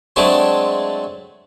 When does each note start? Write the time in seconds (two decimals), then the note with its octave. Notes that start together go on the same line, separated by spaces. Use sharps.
0.16 F#3 G#3 A3 C4 D4 G#4